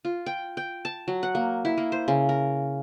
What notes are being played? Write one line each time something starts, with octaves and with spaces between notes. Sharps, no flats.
F4
G5
G5
A5
F#3
F#5
A#3
E4
A#3
C5
C#3
A#4